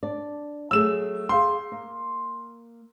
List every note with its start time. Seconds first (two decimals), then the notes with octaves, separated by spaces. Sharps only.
0.03 D4 D5
0.71 F#3 A3 G#4 E6 E7
1.29 G#4 F5 G5 C6
1.72 A#3